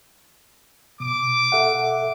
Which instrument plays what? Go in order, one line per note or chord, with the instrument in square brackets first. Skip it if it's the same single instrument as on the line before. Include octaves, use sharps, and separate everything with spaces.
[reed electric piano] B2 [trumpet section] D6
[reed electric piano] A4 E5 F#5